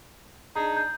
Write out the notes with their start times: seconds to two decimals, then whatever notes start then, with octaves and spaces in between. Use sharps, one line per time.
0.56 D4 D#4 G#4 A#5
0.77 G6